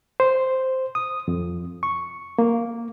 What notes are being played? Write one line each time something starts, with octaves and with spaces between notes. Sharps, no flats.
C5
D#6
F2
C#6
A#3